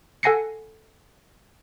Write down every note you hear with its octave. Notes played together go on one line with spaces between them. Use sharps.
A4 F#5 G#5 A#6 C7 C#7